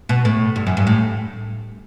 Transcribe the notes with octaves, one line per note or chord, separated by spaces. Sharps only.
B2
A2
G2
F#2
G2
A2